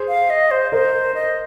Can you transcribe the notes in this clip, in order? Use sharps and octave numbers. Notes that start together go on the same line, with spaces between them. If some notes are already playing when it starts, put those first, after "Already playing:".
Already playing: G#4 C5
F5
D#5
C5
A#4 C5 D#5
D#5